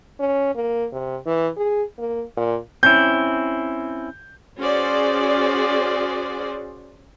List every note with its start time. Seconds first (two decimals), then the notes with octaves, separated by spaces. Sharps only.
0.20 C#4
0.55 A#3
0.93 C3
1.26 E3
1.57 G#4
1.98 A#3
2.37 A#2
2.83 C4 C#4 E4 G6
4.58 C#4 F#4 G#4 C5 D5